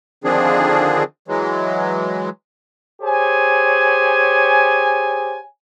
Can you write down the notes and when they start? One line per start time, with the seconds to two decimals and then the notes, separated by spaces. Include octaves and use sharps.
0.24 D3 D#3 F3 C4 D4 G#4
1.28 E3 F#3 G#3
3.02 G4 G#4 C5 C#5 G#5